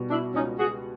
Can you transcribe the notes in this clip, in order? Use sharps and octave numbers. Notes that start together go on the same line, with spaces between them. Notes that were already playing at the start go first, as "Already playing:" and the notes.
Already playing: B2 G3
D4 E4
C#2 C#4 D#4
F#4 G#4